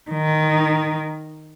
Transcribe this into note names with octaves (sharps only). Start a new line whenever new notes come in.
D#3